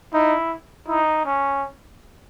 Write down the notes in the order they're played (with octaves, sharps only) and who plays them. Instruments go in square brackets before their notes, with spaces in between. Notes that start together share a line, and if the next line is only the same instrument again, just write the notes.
[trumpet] D#4 [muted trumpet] E4
[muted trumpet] D#4 [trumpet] E4
[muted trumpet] C#4